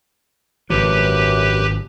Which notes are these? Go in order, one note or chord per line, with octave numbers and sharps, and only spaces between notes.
G#1 F#2 C#3 F3 G4 B4